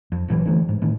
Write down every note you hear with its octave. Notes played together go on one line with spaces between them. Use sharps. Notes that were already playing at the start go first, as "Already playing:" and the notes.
F2
G#1 A#2 E3 F#3
D3 E3 A3
G#2
A2 D#3